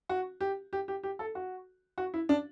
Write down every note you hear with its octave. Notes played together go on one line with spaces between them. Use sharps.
F#4
G4
G4
G4
G4
A4
F#4
F#4
E4
D4